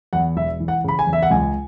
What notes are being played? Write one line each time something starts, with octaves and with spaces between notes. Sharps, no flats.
E2 F#5
E1 E5
E3
F#5
C#3 B5
G#5
E2
E5
F#5
C#2 G#5